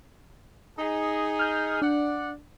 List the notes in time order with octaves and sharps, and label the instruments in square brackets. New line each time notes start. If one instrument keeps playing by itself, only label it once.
[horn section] D#4 G#4
[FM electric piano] F6 G6
[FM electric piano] D4 [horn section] D5 F#5